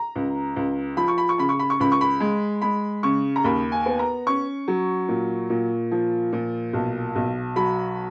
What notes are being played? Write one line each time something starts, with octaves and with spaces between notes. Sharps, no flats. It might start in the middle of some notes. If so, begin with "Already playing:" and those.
Already playing: A#5
C#2
C#2
F3 B5
C#6
B5
C#6
C#3 B5
C#6
B5
C#6
C#2 B5
C#6
B5
G#3
G#3 B5
C#3 C#6
A#5
D#2 B5
G#5
B3
A#5
C#4 C#6
F#3
A#2
A#2
F3
A#2
B1
B1
F#3 B5